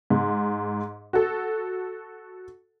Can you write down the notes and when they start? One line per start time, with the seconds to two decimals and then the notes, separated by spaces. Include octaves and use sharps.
0.10 G#2
1.13 F#4 A4